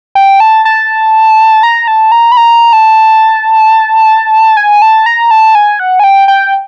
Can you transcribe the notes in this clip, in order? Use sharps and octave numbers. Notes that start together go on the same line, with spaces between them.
G5
A5
A5
A#5
A5
A#5
B5
A#5
A5
G#5
A5
A#5
A5
G#5
F#5
G#5
G5
G5